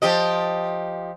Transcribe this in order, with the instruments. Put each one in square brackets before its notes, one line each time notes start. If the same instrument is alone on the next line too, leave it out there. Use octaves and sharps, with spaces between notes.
[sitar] F3 G4 D#5